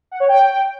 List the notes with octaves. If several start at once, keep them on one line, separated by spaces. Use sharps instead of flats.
F#5
C#5
G5